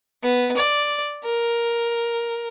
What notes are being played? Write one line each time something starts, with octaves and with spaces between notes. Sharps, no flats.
B3
D5
A#4